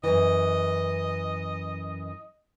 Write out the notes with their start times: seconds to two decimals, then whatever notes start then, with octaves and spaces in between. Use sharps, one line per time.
0.03 F#2 E3 D#5